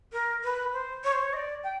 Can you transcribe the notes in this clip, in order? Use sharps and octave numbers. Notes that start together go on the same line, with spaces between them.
A#4
B4
C5
C#5
C5
C#5
D#5
D5
G5